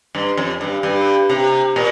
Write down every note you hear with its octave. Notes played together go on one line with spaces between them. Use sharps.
G2
F2
G2
G2
C3
A#2